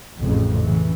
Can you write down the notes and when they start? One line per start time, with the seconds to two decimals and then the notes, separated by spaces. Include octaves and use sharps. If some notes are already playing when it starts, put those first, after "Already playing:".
0.19 A1 F2 A2 C#3
0.65 A2 C#3 E3